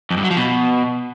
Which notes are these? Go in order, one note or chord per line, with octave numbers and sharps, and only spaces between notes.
F2
G2
F#3
F3
B2